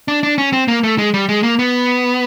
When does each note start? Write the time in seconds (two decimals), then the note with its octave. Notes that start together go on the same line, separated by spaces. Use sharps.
0.08 D4
0.23 D4
0.38 C#4
0.53 C4
0.68 A#3
0.83 A3
0.98 G#3
1.14 G3
1.29 G#3
1.43 A#3
1.59 B3